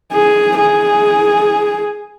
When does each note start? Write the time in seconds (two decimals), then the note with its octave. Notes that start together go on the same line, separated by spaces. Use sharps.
0.13 G#4
0.59 G#4